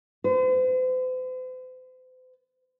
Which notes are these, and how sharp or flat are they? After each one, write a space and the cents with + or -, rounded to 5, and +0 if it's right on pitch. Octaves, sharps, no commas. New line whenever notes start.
C5 -45